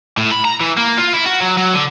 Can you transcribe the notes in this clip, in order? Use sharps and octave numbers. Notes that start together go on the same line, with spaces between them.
A2
B5
A#5
E3
A#3
F4
E4
F#4
F#3
F#3
D3